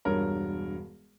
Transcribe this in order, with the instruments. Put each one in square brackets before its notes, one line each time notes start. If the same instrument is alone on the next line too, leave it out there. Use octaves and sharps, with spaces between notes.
[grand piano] E1 G2 A#4 C#5